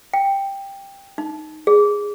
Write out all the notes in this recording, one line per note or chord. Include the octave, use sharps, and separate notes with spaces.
G5
D#4
G#4